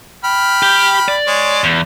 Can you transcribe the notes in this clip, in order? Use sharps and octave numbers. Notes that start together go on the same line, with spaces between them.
G5 B5 F6
G4
D5
G#3 C#5
E2